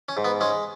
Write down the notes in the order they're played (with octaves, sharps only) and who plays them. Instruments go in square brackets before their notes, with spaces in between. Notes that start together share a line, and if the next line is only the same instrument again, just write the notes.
[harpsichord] C#4
G#2
B3
G#3 C#4